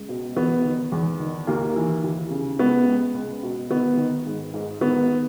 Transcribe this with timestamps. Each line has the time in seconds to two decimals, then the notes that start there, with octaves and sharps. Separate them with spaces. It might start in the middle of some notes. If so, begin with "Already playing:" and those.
Already playing: C#2
0.09 B2
0.36 E2 B3
0.65 D#3
0.92 E2
1.20 D#3
1.47 D#2 A#3
1.76 E3
2.04 D#2
2.31 C#3
2.59 C#2 B3
2.86 C#2
3.14 C#2
3.43 B2
3.70 D#3 B3
3.97 D#3
4.26 G#2
4.54 G#2
4.81 D#3 B3